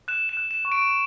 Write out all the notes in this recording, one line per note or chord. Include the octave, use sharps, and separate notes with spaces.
F#6 E7
E7
F#6
E7
C#6
D7